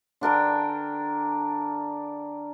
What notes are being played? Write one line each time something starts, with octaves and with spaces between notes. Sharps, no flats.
D3 D4 A#4 G5